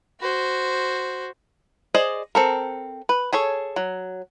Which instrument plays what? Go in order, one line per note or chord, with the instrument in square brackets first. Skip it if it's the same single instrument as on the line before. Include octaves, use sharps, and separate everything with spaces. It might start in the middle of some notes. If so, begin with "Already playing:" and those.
[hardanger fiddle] F#4 C5
[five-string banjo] G#4 C5 D5 D#5
C4 A4 A#4
B4
G#4 A4 C#5
F#3